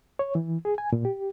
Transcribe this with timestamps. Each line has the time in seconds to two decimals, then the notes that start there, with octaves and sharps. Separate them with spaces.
0.19 C#5
0.35 E3
0.65 G#4
0.78 G#5
0.93 A#2
1.05 G4